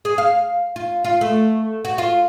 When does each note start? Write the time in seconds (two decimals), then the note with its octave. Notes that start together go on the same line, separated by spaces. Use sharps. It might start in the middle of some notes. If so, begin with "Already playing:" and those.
0.05 G#4
0.18 F5
0.76 F4
1.05 F4
1.21 A3
1.85 F#4
1.98 F4